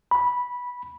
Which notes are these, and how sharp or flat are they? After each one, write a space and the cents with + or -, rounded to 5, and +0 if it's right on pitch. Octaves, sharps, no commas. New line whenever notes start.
B5 -10